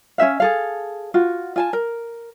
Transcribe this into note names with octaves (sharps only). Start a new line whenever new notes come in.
C#4 F#4 E5 F5
G#4 A4 F5
F4 F#4
F4 G#5 A5
A#4